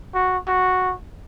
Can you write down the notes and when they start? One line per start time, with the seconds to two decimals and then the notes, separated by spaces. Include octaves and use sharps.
0.14 F#4
0.47 F#4